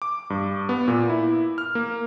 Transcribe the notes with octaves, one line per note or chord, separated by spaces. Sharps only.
D6
G2
B3
A#2
E4
F6
A#3